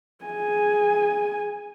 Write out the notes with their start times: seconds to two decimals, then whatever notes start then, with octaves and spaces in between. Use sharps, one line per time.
0.24 G#4 G#5